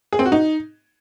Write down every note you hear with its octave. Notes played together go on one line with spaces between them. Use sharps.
G#4
C4
F#4
D#4